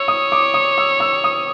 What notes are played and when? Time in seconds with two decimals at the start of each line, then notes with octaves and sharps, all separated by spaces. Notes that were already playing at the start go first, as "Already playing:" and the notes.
Already playing: C#5 E6
0.08 D#6
0.32 D6
0.54 D#6
0.78 E6
1.00 E6
1.24 D#6